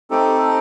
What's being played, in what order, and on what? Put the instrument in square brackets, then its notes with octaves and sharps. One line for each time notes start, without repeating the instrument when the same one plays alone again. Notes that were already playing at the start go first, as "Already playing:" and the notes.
[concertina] A3 C4 D#4 G4 A4